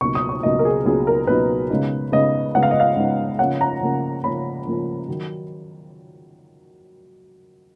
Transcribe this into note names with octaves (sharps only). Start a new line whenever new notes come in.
C#2 B2 F#3 A#3 D#4 C#6
D#6
C#6
C#2 B2 F#3 A#3 D#4 D#5
A#4
G#4
C#2 B2 F#3 A#3 D#4 G#4
A#4
C#2 B2 F#3 A#3 D#4 B4
C#3 G#3 B3 D#4
C#3 G#3 B3 D#4 D#5
C#3 G#3 B3 D#4 F#5
F5
D#5
F5
C#3 G#3 B3 D#4
C#3 F3 A#3 C#4 F#5
A#5
C#3 F3 A#3 C#4
C#3 F3 A#3 C#4 B5
C#3 F3 A#3 C#4
D#3 F#3